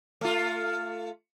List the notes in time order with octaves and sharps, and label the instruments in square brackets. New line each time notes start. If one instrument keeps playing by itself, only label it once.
[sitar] A3 F4